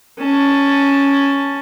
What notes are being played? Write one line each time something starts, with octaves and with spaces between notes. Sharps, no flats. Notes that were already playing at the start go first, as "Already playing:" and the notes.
C#4 A5